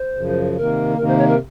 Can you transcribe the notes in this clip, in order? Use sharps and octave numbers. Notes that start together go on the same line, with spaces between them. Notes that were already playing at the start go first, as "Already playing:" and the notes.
Already playing: C5
F#2 C#3 F3
C3 D#3 A#3 A#4
C3 D#3 A#3 A#4
C5
C#5
A#4